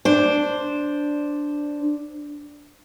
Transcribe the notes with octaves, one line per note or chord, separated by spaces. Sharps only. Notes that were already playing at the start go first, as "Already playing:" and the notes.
D4 C5